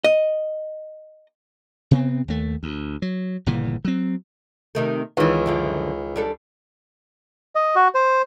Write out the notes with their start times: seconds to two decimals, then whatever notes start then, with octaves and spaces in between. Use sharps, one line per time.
0.04 D#5
1.91 C3 B3 C4
2.28 D#2 A3
2.63 D2
3.02 F#3
3.46 G1 A#2 C#3 E3
3.85 F#3 C4
4.75 C3 D#3 A3
5.17 C#2 D#3 E3 B3
5.46 F#2 D3 F3
6.16 G3 D4 A4
7.55 D#5
7.75 F#4
7.95 C5